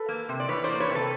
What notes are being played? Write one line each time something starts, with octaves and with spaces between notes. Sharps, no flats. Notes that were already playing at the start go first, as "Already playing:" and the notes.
Already playing: A4 B4
A#3
C3
D5
E2 B4 C#5
C5 D5
A#3
B4 C#5
C3
A4 B4